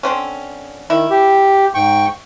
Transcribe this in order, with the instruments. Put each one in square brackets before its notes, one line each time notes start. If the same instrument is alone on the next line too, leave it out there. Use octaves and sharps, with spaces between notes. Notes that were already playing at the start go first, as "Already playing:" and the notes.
[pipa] D3 C4 C#4
[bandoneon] D#3 [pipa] E4
[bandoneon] G4
G#2 G5 C#6